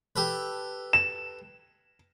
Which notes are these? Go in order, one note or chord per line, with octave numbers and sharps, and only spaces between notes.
G4 A4 B4
E7